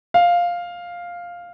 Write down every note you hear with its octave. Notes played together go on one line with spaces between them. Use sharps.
F5